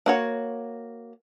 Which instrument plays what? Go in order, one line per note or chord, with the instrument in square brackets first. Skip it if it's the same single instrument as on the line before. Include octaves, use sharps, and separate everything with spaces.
[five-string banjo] A#3 F#4 C#5